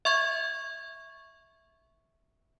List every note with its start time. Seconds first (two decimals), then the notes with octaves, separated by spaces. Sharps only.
0.05 E5 C#6 G#6